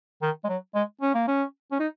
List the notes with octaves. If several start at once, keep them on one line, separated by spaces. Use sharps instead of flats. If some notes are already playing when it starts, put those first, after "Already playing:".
D#3
G#3
F#3
G#3
C#4
A#3
C#4
C#4
D#4